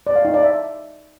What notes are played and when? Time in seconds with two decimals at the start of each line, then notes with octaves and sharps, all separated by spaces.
0.07 D5
0.16 F5
0.25 D#4
0.34 D5
0.43 E5